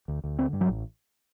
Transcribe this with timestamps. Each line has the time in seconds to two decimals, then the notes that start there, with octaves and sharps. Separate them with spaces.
0.08 D2
0.24 D2
0.38 D3 C4
0.53 G2
0.61 F#3
0.68 A1